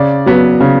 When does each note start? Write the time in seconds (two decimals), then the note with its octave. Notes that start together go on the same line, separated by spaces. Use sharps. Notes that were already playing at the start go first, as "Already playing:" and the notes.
Already playing: C#3 D5
0.26 F#3 B3
0.60 C#3